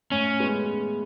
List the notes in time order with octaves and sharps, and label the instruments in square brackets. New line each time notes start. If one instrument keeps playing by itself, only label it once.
[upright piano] A2 [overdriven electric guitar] C#4
[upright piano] G#3 B3